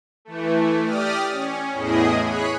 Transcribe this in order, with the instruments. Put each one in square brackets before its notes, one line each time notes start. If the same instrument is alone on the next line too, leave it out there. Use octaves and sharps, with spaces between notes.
[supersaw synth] E3 A3
G4 D5 D#6 F6
C#4
E2 A2 E4 G#4 D#5
G#4 C#5 B5 F#6